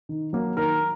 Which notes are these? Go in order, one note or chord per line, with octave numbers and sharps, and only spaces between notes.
D#3
F#3 A#3
D#3 A#4